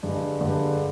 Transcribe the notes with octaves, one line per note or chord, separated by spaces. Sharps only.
G2 D3 G#3
G2 D3 G#3